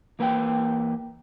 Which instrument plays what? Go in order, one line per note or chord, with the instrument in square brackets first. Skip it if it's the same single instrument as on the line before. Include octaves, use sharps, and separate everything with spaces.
[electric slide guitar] E3 A#3 B4 D#5 G5